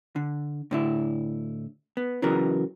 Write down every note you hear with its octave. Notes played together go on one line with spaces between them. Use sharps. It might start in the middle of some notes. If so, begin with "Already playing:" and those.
D3
A2 D3 E4
B3
C#3 E3 F#3 B3 A#4